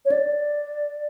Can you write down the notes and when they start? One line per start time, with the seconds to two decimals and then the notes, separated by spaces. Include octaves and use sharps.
0.05 C#5
0.12 D5